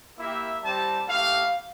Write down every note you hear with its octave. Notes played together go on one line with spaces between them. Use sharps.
A#3 E4 G4 E5
G3 C4 E4 G4 A5
A3 E4 G4 F5